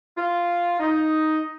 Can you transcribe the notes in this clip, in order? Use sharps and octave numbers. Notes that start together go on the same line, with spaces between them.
F4
D#4